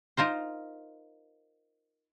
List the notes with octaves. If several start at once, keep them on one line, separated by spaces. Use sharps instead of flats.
D#4 F4 A#4 C5